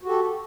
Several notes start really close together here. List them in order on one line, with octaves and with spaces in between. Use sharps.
F#4 G4 A4